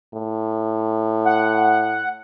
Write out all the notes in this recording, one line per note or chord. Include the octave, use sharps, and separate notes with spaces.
A2
F#5